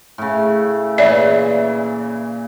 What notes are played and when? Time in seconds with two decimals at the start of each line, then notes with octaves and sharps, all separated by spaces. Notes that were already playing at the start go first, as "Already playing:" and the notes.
0.18 A2 C#3
0.98 A#2 C#3 E3 C#5 D5 E5